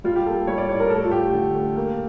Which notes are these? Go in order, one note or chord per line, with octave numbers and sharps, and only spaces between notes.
G3 F4
G4
A#3 A4
G3 C#5
D5
A2 C#5
A#4
A3 A4
F4
A3 G4
D3
A3
A#3